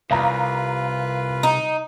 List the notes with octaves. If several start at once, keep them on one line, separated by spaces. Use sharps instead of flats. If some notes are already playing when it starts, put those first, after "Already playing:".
C2 F4 B4 F5 A#5
D#4